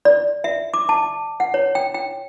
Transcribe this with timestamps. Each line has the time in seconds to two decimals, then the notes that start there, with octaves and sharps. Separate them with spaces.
0.05 D5
0.44 E5
0.74 D6
0.89 A5
1.40 F#5
1.54 C#5
1.75 G5
1.94 G5